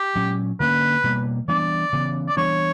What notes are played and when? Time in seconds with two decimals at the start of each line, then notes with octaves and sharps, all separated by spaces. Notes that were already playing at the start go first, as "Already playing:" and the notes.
Already playing: G4
0.15 A#2 F#3 C#4
0.60 D3 A#3 C#4 B4
1.04 B2 G3 A#3
1.48 E3 G3 B3 D4 D5
1.93 C#3 E3 B3
2.28 D5
2.37 E3 G3 B3 D4 C#5